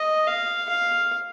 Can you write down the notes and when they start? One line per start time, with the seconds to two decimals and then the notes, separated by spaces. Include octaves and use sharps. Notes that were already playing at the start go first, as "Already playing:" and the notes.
Already playing: D#5
0.27 F5
0.69 F5